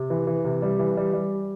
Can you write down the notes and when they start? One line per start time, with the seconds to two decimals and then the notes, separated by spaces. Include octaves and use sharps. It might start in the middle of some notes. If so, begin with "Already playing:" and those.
Already playing: C3
0.10 E3
0.27 E3
0.44 C3
0.62 G3
0.79 E3
0.97 G3
1.13 G3